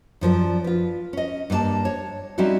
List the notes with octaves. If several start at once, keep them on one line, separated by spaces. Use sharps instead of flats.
F#2 F3 A#4 D5
F4 B4
C#4 D#5
G2 A#3 D#4 D5 A5
C#5
G3 C4 C#4 D#4 E4 F#4